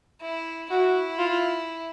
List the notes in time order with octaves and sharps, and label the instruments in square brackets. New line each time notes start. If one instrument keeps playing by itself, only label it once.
[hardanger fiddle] E4
[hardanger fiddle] E4 [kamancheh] F#4
[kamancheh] F4